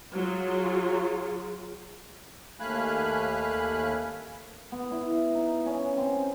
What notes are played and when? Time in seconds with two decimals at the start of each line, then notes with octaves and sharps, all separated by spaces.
0.14 F#3 F4 G#4
2.60 D#2 A3 F5 G#5 B5 F#6
4.72 B3
4.91 E4
5.11 F5
5.34 D#4
5.66 C#4
5.97 C4